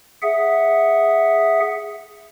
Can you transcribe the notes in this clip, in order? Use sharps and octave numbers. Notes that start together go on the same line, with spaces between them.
G#4 E5 F#5